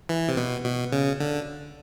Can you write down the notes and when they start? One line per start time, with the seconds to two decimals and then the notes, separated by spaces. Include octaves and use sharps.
0.09 E3
0.29 C3
0.37 B2
0.65 B2
0.92 C#3
1.20 D3